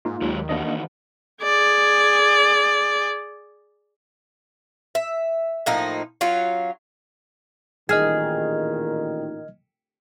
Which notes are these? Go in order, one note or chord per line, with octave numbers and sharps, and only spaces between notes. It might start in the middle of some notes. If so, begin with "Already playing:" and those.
G#2 A#3 D#4 F4
D#2 F#3 G#3 G4
D#3 E3 A#3 D4 F#4 D#5
G#4 D5
E5
A2 F3 A#3 D#4
F#3 C#4 F4
A1 A#2 D#3 G#4 D#5 F6 G#6